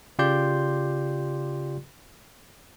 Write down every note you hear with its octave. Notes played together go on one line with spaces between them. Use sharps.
C#3 F4 G4 D5 C6 G6